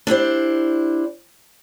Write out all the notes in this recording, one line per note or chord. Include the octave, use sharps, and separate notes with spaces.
D4 E4 G4 C5